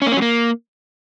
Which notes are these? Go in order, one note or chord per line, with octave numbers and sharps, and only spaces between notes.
C#4
A#3
C#4
F#3
A#3